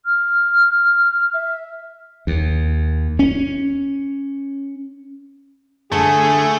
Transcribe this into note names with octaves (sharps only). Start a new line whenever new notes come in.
F6
E5
D#2
C#4
D3 A3 G#4 A5